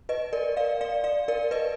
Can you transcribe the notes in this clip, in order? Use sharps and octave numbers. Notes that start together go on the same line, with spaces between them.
B4 D#5
A#4 D5
D5 F5
D5 F5
D5 F5
A#4 D5
B4 D#5